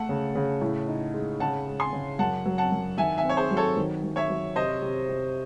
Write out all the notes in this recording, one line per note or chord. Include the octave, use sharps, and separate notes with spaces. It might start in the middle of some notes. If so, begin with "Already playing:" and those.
Already playing: A3 F#5 A5
C#3
C#3
A2
D#4
G#3
C#3 F#5 A5
G#3
G#5 C6
C#3
F#2 F#5 A5
F#3
F#5 A5
F#2
D#3 E5 G#5
E5 G#5
C4 C#5
G#4 C5
F#3
A4 C#5
D#3
F#3
C#5 E5
F#3
C3 C5 D#5
C3
C3